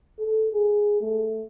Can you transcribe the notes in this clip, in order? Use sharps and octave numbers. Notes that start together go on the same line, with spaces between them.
A4
G#4
A3